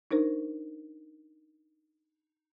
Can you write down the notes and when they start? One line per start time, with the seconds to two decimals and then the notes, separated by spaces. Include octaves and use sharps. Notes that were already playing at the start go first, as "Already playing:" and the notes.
0.11 D4 D#4 A#4 C5